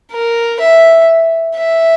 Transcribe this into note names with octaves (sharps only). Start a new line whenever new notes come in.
A#4
E5
E5